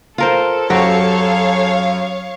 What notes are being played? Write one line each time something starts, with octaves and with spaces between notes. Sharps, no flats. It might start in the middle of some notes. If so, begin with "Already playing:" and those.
F4 A4 A#4 C5
F#2 F#4 G4 C#5 F5